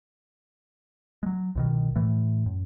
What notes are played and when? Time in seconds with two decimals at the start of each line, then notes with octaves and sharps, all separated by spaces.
1.23 F#3 G#3
1.55 C2 B2 D#3
1.96 A2 E3 A3
2.46 F#2